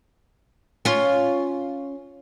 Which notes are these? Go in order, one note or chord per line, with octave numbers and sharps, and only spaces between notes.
C#4 F4